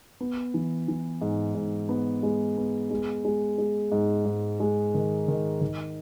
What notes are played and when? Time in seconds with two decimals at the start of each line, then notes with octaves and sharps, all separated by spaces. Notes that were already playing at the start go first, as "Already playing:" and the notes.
0.21 B3
0.54 E3
0.88 E3
1.21 G#2
1.55 G#2
1.89 B3
2.23 G#3
2.57 B3
2.90 G#3
3.25 G#3
3.58 G#3
3.92 G#2
4.25 G#2
4.60 G#3
4.94 D#3
5.28 D#3
5.61 D#3